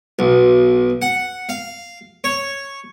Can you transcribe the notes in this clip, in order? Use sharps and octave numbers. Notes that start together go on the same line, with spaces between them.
B1
F#5
F5
C#5